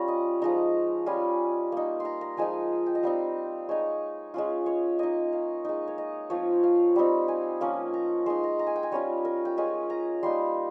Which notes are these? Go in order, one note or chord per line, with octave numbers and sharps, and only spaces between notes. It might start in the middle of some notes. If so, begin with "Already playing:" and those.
Already playing: G3 C#4 F4 A#5
D#5
F3 G#3 D#4 A#5
G3 C#4 F4 G#5
A#3 D#4
A#5 C6
A#5
F3 G#3 D#4 G#5
G5
D#5
G3 C4 D#4 F5
G#3 D#4 C#5
G#3 C#4 F4
C#5
A#3 D#4 D#5
F5
G#3 D#4
C#5
D#5
F3 C4 F4 C#5
F5
G3 C4 D#4
G#5
F3 A#3 C#4
A#5
G#3 D#4 C6
A#5
A#5
G#5
G5
G#5
G3 C#4 F4 C#5
A#4
G5
G#3 C#4 F4 G#5
A#5
G3 A#3 D#4 C6